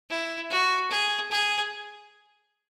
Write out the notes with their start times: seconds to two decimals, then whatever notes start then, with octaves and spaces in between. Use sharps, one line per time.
0.10 E4
0.51 F#4
0.91 G#4
1.31 G#4